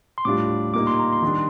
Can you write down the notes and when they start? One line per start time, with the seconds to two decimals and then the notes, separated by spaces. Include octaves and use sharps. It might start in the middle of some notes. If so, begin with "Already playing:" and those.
0.18 C6
0.25 A2 G3 D4 F4 D6
0.74 A#2 G3 A#3 D#4 D6
0.87 C6
0.99 A#5
1.13 C6
1.22 D#3 G3 D4